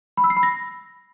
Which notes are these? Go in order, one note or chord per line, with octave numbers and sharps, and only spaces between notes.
B5
E6
C7
B5
A#6